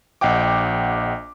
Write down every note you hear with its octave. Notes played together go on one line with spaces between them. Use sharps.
A#1 D#5 F#5 G5 D6